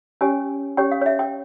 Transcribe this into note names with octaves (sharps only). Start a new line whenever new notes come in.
C#4 G4 C#5 G#5
C#4 G4 C#5 G5
F5
C#5
E5
G5